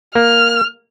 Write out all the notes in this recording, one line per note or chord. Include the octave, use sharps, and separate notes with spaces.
A#3 F6